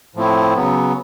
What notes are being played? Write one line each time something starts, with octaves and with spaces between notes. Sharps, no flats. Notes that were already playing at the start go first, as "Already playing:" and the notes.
A2 F3 A3 C4 E4
C#3 F#3 B3